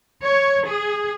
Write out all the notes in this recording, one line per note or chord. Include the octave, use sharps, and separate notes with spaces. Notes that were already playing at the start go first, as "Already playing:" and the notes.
C#5
G#4